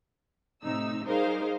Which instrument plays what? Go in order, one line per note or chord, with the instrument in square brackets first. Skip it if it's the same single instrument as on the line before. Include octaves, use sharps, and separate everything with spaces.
[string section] A2 C3 D#4 E6
G3 D#4 G#4 A#4 C5 F5